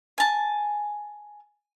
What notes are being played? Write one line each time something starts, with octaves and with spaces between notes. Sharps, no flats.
G#5 A5